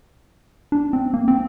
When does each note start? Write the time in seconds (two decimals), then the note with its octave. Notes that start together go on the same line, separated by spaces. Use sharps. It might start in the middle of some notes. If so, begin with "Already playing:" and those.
0.72 D4
0.93 C4
1.14 A#3
1.28 C4